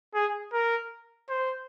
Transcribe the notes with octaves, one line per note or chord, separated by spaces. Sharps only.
G#4
A#4
C5